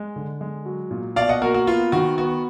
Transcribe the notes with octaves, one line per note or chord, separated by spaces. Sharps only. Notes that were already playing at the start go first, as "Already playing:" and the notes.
Already playing: G#3
D3
G#3
F#3
A#2
B2 D5 F5
D#5 F#5
A#3 F#4 A#4
F#4
B3 F4
D#3 F#4
B3 F#4